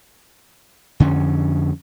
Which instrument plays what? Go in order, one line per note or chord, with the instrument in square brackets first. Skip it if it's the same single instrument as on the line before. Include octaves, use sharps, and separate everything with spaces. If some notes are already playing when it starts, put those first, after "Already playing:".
[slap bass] F2 D3 C#4